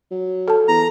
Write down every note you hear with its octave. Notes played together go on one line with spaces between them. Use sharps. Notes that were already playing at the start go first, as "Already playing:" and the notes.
F#3
A4 A5
E2 A#5